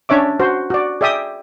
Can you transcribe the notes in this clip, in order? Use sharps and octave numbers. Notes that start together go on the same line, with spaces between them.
C#4 D4 C#5 E5 D6
F#4 C5
F#4 D5
G#4 D5 E5 G5 D#6